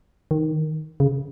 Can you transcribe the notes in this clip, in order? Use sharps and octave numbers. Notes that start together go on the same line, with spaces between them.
D#3
C#3